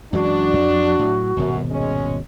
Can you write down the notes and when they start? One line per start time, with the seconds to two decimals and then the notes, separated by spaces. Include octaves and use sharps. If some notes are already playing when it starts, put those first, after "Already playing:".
0.13 F#2 E3 G#3 D4 F#4
0.54 F2 F#3
0.99 A2 F#3
1.37 D#1 G#1 F#2 B2
1.71 G#3 C#4